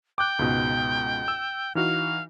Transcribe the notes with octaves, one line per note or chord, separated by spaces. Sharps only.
G5 D6 F#6
C#2 G#2 B2
E6
E3 D#4 F#4 F5